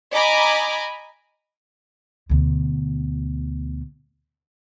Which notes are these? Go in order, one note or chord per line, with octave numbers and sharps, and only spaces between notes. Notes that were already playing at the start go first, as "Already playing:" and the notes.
D#5 G#5 A#5 B5 D6
D2 B2